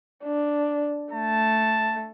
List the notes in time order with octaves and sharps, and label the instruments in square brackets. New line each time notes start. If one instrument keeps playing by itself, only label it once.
[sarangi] D4
[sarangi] A3 [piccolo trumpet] A5